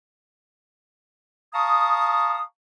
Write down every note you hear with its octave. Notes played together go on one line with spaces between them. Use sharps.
F5 A5 A#5 C#6 D#6